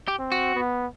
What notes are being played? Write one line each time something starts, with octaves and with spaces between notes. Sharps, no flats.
G4
C4
F#4
B3